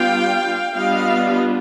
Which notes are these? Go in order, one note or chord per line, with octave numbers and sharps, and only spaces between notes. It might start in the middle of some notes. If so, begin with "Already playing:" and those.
Already playing: G3 B3 D4 F4 F5 G5
G3 B3 D4 F4 D#5 F5